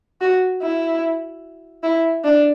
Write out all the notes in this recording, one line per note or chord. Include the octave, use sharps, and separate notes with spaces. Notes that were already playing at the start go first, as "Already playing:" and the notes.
F#4
E4
E4
D4